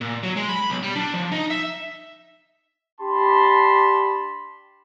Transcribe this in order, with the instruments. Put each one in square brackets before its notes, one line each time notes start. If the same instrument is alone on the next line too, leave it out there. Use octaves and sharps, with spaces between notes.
[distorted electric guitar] A#2
F#3
G#3
B5
B1
G3
D4
F3
D#4
E5
[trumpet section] D4 G4 A5 B5 C6